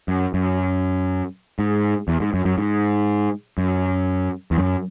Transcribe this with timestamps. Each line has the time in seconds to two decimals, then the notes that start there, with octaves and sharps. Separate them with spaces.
0.08 F#2
0.34 F#2
1.59 G#2
2.08 E2
2.20 G#2
2.34 F#2
2.45 F#2
2.58 G#2
3.58 F#2
4.51 E2
4.58 F#2